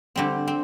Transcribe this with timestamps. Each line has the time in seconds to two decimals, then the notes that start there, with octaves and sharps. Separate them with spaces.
0.16 D3 G3 C4
0.48 C4